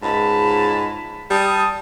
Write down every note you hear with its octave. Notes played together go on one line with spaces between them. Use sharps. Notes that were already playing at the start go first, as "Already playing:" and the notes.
C#2 G#2 A5 B5
G3 A5 D#6